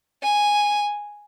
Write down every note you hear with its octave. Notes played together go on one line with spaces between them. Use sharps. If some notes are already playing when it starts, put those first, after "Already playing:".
G#5